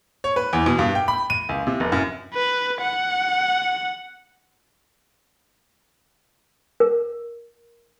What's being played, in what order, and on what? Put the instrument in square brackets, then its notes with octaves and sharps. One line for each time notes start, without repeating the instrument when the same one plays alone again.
[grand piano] C#5
B4
E2
B2
G2
G5
B5
D#7
C#2
C3
F1
F#2
[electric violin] B4
F#5
[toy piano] A#4